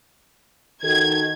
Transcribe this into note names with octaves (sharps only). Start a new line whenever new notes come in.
D#3 F#4 A4 G#6